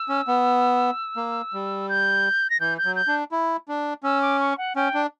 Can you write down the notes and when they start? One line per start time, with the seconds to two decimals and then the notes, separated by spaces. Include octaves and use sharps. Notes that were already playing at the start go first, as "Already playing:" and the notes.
Already playing: E6
0.09 C#4
0.28 B3
1.17 A#3
1.53 G3
1.89 G6
2.50 A#6
2.60 E3 G6
2.78 G6
2.85 F#3
2.96 G6
3.08 D4
3.32 E4
3.68 D4
4.03 C#4 E6
4.22 D6
4.40 C#6
4.58 F#5
4.76 C#4 G5
4.94 D4